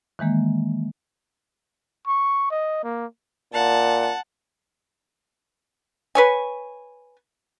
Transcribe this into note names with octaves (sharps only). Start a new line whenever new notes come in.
D#3 E3 G#3 A#3
C#6
D#5
A#3
A#2 F#5 A5
B4 C#5 G#5